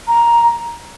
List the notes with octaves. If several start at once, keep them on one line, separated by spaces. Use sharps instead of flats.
A#5